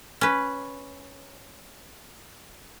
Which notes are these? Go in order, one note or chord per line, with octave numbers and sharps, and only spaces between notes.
C#4 B4